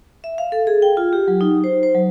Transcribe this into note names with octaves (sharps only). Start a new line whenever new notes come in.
E5
F5
A4
G#4
G5
F4
G4
F#3
D#4
C5
C5
F#3